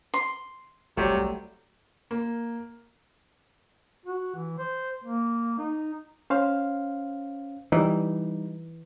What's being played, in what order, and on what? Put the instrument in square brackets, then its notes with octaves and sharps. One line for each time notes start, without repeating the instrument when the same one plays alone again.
[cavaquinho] C6
[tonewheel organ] F#1 B1 [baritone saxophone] C3 [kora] F#3 G3 A3
[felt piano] A#3
[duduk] F#4
E3
C5
A#3
D#4
[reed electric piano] C#4 C5 F5
[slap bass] E3 [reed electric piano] G3 D#4